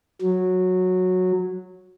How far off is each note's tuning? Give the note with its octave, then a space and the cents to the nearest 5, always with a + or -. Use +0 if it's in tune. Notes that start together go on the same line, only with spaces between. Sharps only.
F#3 -10